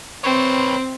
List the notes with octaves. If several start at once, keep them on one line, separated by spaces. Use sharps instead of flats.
C4 B4 C#5